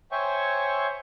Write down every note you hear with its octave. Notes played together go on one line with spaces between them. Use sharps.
C5 C#5 E5 G5 G#5 C#6